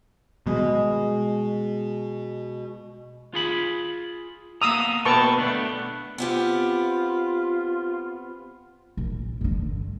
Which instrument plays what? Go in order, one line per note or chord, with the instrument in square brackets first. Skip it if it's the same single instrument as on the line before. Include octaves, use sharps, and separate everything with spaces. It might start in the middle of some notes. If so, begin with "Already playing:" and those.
[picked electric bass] B2 [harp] G#3
[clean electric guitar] F4 G#4 B5
[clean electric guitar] A#3 B3 A#5 [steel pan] D#6 E6
[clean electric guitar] B2 A#4 G5 [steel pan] B4 A5 C#6
[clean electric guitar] A3 B3 D4
[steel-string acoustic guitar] B3 C4 G4 [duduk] F4
[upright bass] A#1
G2 D3